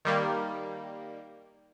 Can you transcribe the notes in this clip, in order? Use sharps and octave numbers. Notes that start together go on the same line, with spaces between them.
D#3 G3 A#3